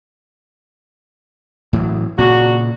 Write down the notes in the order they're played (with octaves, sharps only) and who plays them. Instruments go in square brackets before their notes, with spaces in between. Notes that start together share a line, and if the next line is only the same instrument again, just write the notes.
[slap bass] A2 E3 F#3
[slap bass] A#2 C#3 [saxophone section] F#3 D4 F#4